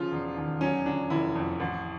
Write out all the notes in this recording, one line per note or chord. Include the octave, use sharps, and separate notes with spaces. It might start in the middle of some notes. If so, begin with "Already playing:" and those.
Already playing: C#3 F3 F4
E1
D#2
F#3 C#4
D3 D4
F1 E4
F2
A1